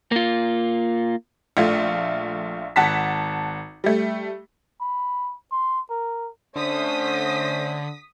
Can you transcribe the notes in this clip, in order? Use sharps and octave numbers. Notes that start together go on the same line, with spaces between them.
A#3 F4
A#1 A3 F4
G#1 F#5 A5 B6
G3 A3
B5
C6
A#4
D3 A3 C#4 C5 D#6 B6